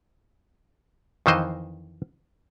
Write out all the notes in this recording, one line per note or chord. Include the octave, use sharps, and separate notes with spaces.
F2 D#3 E3 C5 D#5